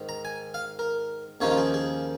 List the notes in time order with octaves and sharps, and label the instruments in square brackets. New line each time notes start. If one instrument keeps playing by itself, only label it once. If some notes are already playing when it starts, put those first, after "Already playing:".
Already playing: [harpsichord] G#2 D#3
A#5
G#5
F5
A#4
D#2 C#3 F3 A#3 D#4 C#5
F4
G#4
G#4